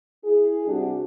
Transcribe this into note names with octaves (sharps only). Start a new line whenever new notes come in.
E4 G#4
C3 G3 D4 F#4 G4